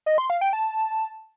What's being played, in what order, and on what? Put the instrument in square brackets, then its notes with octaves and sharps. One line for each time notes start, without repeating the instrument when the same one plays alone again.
[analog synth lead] D#5
C6
F5
G5
A5